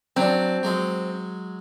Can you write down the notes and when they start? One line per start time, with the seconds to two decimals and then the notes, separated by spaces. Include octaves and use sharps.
0.16 F#3 C4 D4
0.63 F#3 G#3